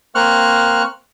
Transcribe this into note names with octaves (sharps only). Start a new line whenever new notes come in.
A#3 C4 C#6 F6 F#6